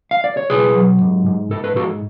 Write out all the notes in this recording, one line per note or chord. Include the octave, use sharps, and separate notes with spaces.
F5
D5
C#5
B1 G#4 B4
F#3
G#2
G#2
G#2 A4
B4
G#2 F#4 A4